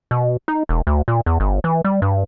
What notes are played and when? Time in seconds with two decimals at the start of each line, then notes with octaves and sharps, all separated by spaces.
0.11 B2
0.48 D#4
0.69 E1
0.87 D2
1.08 A#2
1.26 E2
1.40 G1
1.64 E3
1.85 G3
2.02 G2